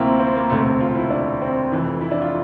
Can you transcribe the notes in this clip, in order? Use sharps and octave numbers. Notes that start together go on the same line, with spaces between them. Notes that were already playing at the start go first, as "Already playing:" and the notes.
Already playing: D2 C3 F3 A#3 C4 E4
C4
A#3
E1 D2 C3 A3
C4
F4
E4
D4
C4
F1 F2 E3
E4
D4
F4